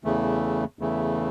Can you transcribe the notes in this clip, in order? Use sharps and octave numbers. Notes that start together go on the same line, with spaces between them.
E2 C#3 E3 A3
E2 C#3 E3 A3